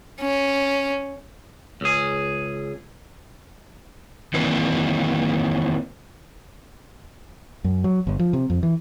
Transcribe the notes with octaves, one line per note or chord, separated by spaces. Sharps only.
C#4
C#2 G#4
D#3 E3 A#3 C4
F#2
F#3
G1
F3
C3
F2
E3